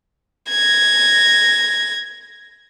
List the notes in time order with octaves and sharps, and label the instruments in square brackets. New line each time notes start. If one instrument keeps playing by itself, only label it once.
[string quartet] G#6 A#6